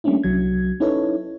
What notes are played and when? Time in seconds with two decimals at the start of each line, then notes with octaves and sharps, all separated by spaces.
0.04 G3 A3 A#3 C#4 D4 E4
0.24 C2 F#3 G#6
0.80 C#4 D#4 E4 A4 B4 C#5